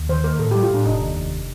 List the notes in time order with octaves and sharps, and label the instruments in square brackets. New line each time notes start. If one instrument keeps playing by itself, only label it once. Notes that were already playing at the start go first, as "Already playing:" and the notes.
Already playing: [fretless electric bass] D#2
[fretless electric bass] D#3 [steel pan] C5
[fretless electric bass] A#3 [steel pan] A#4
[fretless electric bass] A2 [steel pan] A4
[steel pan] G4
[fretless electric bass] G3
[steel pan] F4
[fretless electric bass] A2 [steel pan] D4
[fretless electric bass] F1 [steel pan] D#4
[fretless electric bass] D#2
F1